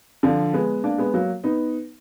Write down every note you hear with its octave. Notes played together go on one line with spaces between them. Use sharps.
D3 F3
G#3 B3
A#3 D4
G#3 B3
F#3 A#3
B3 D#4